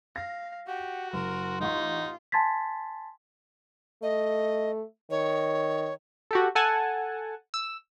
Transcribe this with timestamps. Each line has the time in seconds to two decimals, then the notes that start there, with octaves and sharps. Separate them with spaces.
0.16 F5 A#6
0.67 F#4 G4 F#5
1.13 F#1 A#4 C6 E7
1.61 A1 D#4 F4 F#5 C#6
2.32 G#5 A5 C6 G#6 A6 B6
4.03 A3 D#5
5.10 D#3 C#5
6.31 F#4 G4 A4
6.55 A4 F#5 G#5 A5
7.54 E6